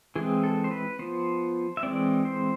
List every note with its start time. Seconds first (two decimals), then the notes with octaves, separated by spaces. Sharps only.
0.16 E3 G#3 C4 G#4
0.44 A4
0.64 C5
0.71 B4
0.99 F3 B3 C5
1.77 E5
1.83 E3 G#3 C4 D5
2.25 C5